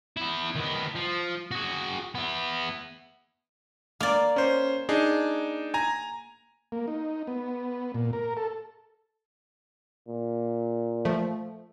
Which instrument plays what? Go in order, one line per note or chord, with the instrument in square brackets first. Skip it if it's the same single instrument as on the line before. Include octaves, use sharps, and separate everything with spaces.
[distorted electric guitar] B3 E4
D#3 B3
F3
F#4 G#4
B3 E4
[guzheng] A#3 D5
[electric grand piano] C#4 C5
D4 D#4 G#4
G#5 A#5
[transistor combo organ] A#3
D#4
B3
A#2
A#4
A4
[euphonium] A#2
[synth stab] F3 A3